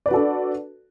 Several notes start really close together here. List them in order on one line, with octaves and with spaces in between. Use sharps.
D5 B4 F#4 A4 D4